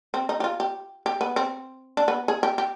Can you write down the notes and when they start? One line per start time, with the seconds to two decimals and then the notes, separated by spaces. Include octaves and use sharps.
0.14 C4
0.29 D#4
0.40 G4
0.44 F4
0.60 G4
1.06 G4
1.21 B3
1.36 C4
1.97 D4
2.08 B3
2.28 G#4
2.43 G4
2.58 G4